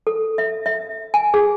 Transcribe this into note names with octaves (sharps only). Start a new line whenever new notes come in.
A4
E5
E5
G#5
G#4